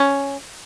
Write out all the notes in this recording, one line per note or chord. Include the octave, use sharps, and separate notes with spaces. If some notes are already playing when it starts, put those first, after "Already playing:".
Already playing: C#4